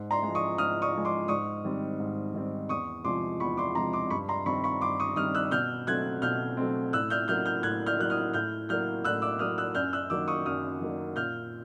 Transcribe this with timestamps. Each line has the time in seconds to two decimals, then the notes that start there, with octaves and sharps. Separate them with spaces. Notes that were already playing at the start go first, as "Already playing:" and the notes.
Already playing: G#2
0.11 A#5 C6
0.23 G#3
0.28 F3
0.35 C#6 D#6
0.58 G#2 D#6 F6
0.82 C#6 D#6
0.93 F3 G#3
1.05 C6 D6
1.28 G#2 C#6 D#6
1.65 D#3 G3 C4
2.00 G#2
2.34 D#3 G3 C4
2.69 E2 C#6 D#6
3.05 C3 F3 G#3 C6 D6
3.40 E2 B5 C#6
3.57 C6 D6
3.75 C3 F3 G#3 A#5 C6
3.93 C6 D6
4.10 G2 B5 C#6
4.28 A#5 C6
4.46 D#3 G3 C4 B5 C#6
4.64 B5 C#6
4.81 G2 C6 D6
5.00 C#6 D#6
5.16 D#3 G3 C4 D#6 F6
5.35 E6 F#6
5.51 B2 F6 G6
5.87 F#3 A3 C4 F#6 G#6
6.22 B2 F6 G6
6.57 F#3 A3 C4
6.93 A2 E6 F#6
7.10 F6 G6
7.28 F#3 A#3 F6 G6
7.46 F6 G6
7.63 A2 F#6 G#6
7.86 F6 G6
7.99 F#3 A#3 F#6
8.10 D#6 F6
8.34 A2 F6 G6
8.69 F#3 A#3 F6 G6
9.05 A2 E6 F#6
9.22 D6 E6
9.39 F#3 A#3 D#6 F6
9.58 E6 F#6
9.75 F#2 F6 G6
9.93 E6 F#6
10.10 D#3 F#3 A#3 D6 E6
10.27 C#6 D#6
10.46 F#2 D#6 F6
10.81 D#3 F#3 A#3
11.16 A#2 F6 G6